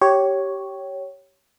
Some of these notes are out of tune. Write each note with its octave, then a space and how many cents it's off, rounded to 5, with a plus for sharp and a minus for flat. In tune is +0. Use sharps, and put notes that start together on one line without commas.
G4 -15 C#5 +0